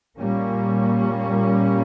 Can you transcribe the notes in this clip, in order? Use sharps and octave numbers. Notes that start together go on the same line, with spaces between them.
A#2 G3 A#3 C#4